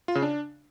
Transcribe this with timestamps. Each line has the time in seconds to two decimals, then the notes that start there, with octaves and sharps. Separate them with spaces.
0.08 F4
0.15 C#3
0.23 D4